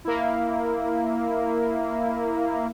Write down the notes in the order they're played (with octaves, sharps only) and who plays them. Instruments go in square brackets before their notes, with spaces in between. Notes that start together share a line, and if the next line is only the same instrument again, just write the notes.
[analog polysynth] A#3 E4